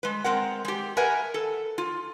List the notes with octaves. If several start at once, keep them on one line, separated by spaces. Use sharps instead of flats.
G#3 B4
G#3 C4 A#4 F#5
G#3 G4
A#4 B4 E5 F#5 G#5
A4
F4